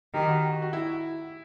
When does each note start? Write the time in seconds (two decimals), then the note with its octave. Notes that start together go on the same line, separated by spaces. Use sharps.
0.14 D#3 G4
0.29 F#4
0.62 F#4
0.73 E4